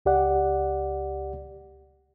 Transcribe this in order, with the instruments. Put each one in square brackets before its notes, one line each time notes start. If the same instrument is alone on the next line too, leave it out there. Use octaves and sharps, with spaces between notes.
[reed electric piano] C#2 G4 D5 F#5